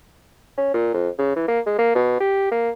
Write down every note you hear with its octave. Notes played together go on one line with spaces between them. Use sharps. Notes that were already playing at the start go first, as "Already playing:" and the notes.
C#4
A#2
F2
C#3
E3
A#3
G#3
A#3
B2
G4
A#3